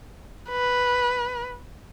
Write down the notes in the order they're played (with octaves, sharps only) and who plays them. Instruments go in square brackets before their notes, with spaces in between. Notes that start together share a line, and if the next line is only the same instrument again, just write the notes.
[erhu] B4